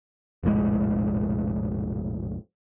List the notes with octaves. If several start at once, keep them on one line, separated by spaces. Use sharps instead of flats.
F1 A#1 A2 G#3